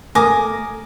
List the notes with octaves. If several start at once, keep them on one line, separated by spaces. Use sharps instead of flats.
A3 A#4 G#5 D6 D#6